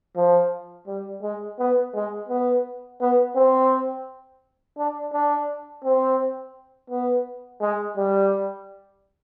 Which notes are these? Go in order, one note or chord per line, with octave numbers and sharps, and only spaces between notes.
F3
G3
G#3
B3
G#3
B3
B3
C4
D4
D4
C4
B3
G#3
G3